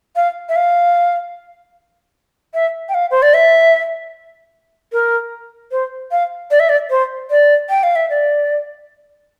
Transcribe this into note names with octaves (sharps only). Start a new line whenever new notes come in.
F5
E5
F5
E5
G5
F5
C5
D5
E5
A#4
C5
F5
D5
E5
D5
C5
D5
G5
F5
E5
D5